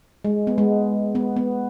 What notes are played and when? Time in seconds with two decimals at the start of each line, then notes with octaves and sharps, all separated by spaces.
0.25 G#3
0.47 B3
0.58 G#3
1.15 B3
1.36 B3